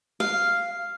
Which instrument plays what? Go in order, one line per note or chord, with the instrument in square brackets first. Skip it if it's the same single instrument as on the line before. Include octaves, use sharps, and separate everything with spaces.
[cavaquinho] F5